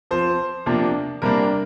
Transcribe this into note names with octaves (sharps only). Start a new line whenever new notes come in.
F3 C4 C5
C3 F3 A#3 D4
C3 G3 A#3 D4 A#4